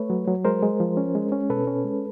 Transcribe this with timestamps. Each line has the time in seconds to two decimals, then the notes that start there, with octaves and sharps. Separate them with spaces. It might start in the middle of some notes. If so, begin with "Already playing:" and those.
Already playing: A3 B4 C#5
0.10 F#3
0.28 F#3
0.45 G#3 A#4 C5
0.63 G#3
0.80 F3
0.97 C#4
1.15 G#3
1.32 C#4
1.50 B2 A4 B4
1.67 C#4
1.84 G#3